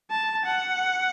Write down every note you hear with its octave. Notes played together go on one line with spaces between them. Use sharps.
A5
F#5